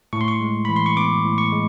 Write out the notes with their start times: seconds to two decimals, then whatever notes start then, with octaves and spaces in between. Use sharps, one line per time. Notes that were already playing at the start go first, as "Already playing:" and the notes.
0.13 A2 C#6
0.21 C6
0.28 C#6
0.41 G#3
0.65 E3 B5
0.76 C6
0.86 C#6
0.97 B3 D6
1.24 A2
1.38 C#6
1.52 G#3